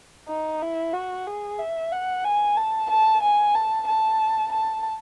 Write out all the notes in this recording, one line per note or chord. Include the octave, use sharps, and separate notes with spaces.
D#4
E4
F#4
G#4
E5
F#5
G#5
A5
A5
G#5
A5
A5
A5